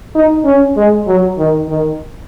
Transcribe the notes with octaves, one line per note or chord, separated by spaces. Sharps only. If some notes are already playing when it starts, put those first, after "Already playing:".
D#4
C#4
G#3
F#3
D#3
D#3